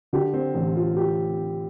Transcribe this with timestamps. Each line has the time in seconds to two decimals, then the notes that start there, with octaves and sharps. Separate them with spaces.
0.13 D3 G4
0.34 C4
0.55 A1
0.76 F4
0.97 G4